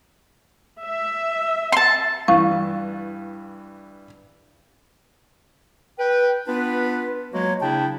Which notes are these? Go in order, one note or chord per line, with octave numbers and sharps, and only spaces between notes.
E5
A5 C6
G2 E3 F5 C#6
B4 G5
B3 D4 F4 B4
F#3 G#3 A#3 F#4 C#5
C#3 D4 E4 G5 A5